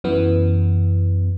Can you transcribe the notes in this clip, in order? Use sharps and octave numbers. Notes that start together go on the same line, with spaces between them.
F#2 E3 B3